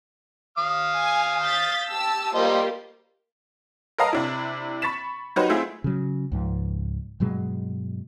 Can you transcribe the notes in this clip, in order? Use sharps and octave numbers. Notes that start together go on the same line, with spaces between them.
F5 D#6 F6
G#5
G6 A6 B6
G4 A5 E6
G3 A#3 F4 G4 C5 D#5
A#4 B4 D#5 F5 A5 A#5
C3 D4 E4
B5 C#6 A6 B6 E7
F#3 D#4 F#4 G4 B4 C5
A3 C4 E4 F4 G#4
C#3 F#3
C#2 G#2 F3
G2 B2 F#3 G#3